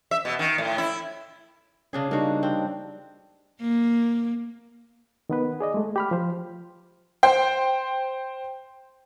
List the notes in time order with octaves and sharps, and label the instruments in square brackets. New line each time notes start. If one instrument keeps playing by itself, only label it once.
[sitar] E5
B2
D#3
A2
E4
[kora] C#3 D4 G#4 [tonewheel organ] C#4
[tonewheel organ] G3 D#4 [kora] A#3 F#4 [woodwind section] D4
[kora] C4
[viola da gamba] A#3
[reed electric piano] D#3 B3 B4
G#4 D5 D#5
G#3 A3
G4 B5 F6
F3 C5
[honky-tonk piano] C5 G5